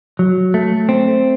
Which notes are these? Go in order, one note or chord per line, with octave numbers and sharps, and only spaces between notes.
F#3
A3
C4